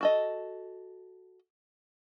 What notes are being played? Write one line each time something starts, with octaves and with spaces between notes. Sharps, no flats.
F#4 A4 D#5